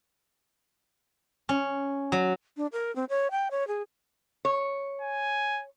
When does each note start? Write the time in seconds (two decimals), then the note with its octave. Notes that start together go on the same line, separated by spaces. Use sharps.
1.49 C#4
2.12 F#3
2.57 D4
2.73 A#4
2.96 C4
3.09 C#5
3.31 G5
3.51 C#5
3.67 G#4
4.45 C#5
5.01 G#5